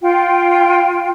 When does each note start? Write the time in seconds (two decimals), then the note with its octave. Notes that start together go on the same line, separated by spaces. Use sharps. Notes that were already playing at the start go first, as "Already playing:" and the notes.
0.02 F4 G5